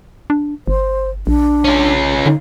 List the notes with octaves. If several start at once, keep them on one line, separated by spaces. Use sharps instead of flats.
D4
G1 C5
A#1 D4
C#4 F4
D3 D#4